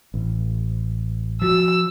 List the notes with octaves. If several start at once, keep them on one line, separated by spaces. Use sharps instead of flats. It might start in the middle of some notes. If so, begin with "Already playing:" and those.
A1
F3 F#4 E6